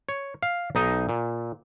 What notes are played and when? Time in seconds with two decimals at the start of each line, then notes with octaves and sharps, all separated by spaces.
0.09 C#5
0.42 F5
0.75 B1 D#4 D#5
1.09 A#2